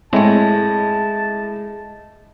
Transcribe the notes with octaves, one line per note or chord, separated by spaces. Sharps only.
A2 G#3 C4 C#5 A5